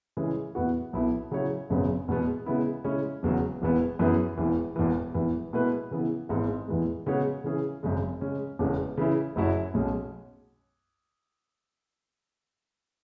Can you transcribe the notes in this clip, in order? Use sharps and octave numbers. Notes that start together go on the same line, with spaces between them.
C#3 E3 G#3 C#4 G#4
E2 E3 B3 F#4
B1 B2 B3 E4
C#3 F#3 E4 C#5
G#1 F#2 C#3 F#3 B3
E2 B2 G#3 B3
C#3 G#3 B3 E4
C#3 G#3 C#4 E4 C#5
E1 E2 C#3 F#3
E1 E2 E3 B3 E4
F#2 E3 B3 G#4 B4
E1 E2 E3
E1 E2 E3
E1 E2 E3
B2 G#3 E4 B4
C#3 E3 B3 E4
G#1 G#2 E3 B3
E2 E3 G#3
C#3 G#3 B3 F#4 C#5
C#3 E3 C#4 G#4
G#1 F#2 C#3 G#3
C#3 G#3 C#4
E1 E2 C#3 G#3 C#4
C#3 E3 C#4 E4
F#1 F#2 F#3 E4 C#5
B1 B2 G#3 C#4